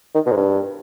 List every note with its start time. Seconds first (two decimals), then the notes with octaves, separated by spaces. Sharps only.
0.15 D#3
0.26 B2
0.32 G#2
0.37 G2